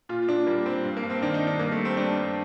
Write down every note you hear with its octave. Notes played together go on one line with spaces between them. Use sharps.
A#2 F4
A#2 D4
G3 A#3
G3 C4
G2
A#3
G2
C4
D#3 D4
D#4
G2
D4
G2 A#3
A3
G3
C4
G2 D4
G2